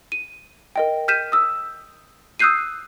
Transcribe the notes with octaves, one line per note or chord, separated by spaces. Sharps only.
D#7
A#4 D#5 G5
F6 G6 B6 D#7 E7
D#6 E6
D#6 E6 F#6 G6 C7 D#7